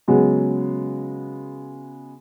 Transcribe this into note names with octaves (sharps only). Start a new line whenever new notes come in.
C#3 F#3 G#3 B3